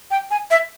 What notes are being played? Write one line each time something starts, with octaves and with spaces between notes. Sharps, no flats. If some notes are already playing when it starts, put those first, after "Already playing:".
G5
G#5
E5